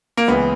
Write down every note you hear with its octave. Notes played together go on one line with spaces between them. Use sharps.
A#3
C#2 C#3 E3 B3